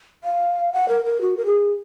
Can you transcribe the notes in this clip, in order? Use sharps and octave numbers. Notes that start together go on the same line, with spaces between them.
F5
F#5
A#4
A#4
F#4
A#4
G#4